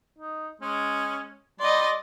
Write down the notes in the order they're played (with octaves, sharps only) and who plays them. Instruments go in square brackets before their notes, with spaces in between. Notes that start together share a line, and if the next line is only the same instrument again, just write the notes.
[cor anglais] D#4
[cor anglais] G#3 [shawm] C#4
[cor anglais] G3 [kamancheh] D5 D#5 [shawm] C6